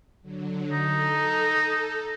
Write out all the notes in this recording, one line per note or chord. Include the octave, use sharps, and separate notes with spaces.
D3 F#3
D#4 A4